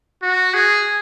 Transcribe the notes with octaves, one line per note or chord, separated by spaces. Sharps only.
F#4
G#4